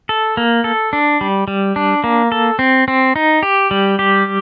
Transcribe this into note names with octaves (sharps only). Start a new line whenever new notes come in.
A4
A#3
A4
D4
G3
G3
D4
A#3
A4
C4
C4
D#4
G4
G3
G4